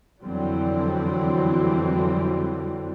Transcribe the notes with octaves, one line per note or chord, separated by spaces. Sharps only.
F2 D3 E3 F#3 G3 C4